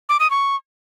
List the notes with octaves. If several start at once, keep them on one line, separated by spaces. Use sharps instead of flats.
D6
D#6
C#6